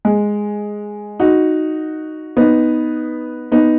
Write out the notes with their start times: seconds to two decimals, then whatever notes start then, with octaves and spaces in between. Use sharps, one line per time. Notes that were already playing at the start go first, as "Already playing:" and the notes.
0.05 G#3
1.20 D#4 F#4
2.37 B3 D#4
3.52 B3 D#4